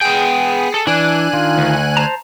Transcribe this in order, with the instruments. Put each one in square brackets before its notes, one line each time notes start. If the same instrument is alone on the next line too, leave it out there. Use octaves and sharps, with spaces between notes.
[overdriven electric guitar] B3 G5 [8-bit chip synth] G#4
[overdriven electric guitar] A4
[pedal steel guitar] E3 [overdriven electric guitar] D4 [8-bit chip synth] G#5 F#6
[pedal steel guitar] D#3 F4
[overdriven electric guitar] D2
[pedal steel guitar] C5 A5 A#5